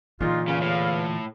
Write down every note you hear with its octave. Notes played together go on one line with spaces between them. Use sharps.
A#2 D3 E3 G#3 D#4 F4
E2 C#3 F5
A2